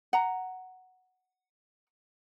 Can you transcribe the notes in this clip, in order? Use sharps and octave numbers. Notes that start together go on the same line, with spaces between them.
F#5 A#5